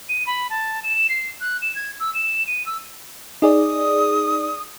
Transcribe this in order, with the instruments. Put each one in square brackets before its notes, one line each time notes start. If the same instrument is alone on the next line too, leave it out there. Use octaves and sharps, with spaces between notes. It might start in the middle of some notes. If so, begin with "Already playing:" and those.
[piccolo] D#7
B5
A5
E7
C7
F#6
E7
G#6
E6
E7
D#7
E6
[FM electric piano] D#4 G#4 D5 [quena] D#6